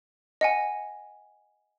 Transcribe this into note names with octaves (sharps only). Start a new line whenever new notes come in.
D#5 F#5 G#5